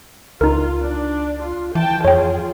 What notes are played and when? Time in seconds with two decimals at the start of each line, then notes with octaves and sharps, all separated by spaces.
0.41 C#2 D#4 F4 A#4
0.81 D4
1.42 F4
1.75 E3 G5 A5
2.05 F2 F4 G#4 C#5 G5